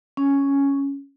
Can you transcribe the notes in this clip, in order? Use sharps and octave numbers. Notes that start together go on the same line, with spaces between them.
C#4